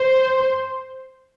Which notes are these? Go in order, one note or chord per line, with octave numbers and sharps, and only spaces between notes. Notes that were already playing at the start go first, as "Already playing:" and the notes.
Already playing: C5